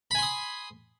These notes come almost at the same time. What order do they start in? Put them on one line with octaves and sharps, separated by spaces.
B5 G#5 C6 D#6